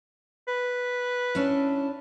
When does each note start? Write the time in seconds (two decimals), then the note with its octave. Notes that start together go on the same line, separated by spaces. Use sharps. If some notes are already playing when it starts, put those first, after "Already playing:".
0.48 B4
1.35 C#4 D4 E4